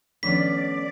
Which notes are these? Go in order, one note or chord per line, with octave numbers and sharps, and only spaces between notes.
D#3 F3 A3 B3 C#4 D4 D5 B6